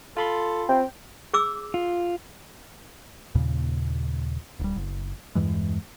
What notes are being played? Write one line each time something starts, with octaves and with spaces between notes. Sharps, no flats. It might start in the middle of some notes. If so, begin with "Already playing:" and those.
F4 A4 B5 C6
C4 G5
G#4 D6 E6
F4
D#2 A#2 C#3
D1 G3
F#1
E2 G2 E3 G#3